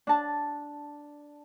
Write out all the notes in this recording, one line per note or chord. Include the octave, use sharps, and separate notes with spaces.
D4 A5